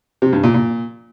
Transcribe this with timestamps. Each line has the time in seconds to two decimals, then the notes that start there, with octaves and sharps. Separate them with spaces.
0.22 C3
0.33 G2
0.43 A#2
0.54 A#2